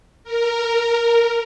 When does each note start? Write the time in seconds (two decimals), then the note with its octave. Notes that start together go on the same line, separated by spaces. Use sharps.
0.24 A#4